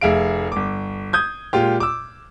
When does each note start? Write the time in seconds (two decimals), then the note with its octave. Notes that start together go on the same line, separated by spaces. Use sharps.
0.01 F1 G#4 E5 F5 D7
0.52 G1 D6
1.13 D#6 G6 G#6
1.53 A#2 G#3 F4 G4
1.80 D6 E6